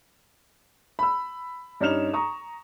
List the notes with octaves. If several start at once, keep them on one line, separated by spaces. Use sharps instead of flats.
B5 E6
G2 C#4 D#4 F6 E7 F7
A#5 C#6 D#6